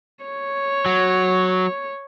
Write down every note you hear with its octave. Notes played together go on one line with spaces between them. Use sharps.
C#5
F#3